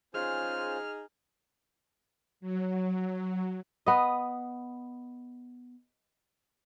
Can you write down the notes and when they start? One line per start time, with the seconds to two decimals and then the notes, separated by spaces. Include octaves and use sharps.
0.14 C#4 D#4 F4 G#4 C5 F6
2.40 F#3
3.86 B3 D#5